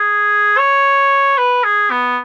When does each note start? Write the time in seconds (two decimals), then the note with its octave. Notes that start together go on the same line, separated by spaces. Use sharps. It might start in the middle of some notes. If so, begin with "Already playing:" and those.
Already playing: G#4
0.58 C#5
1.37 B4
1.64 G#4
1.91 B3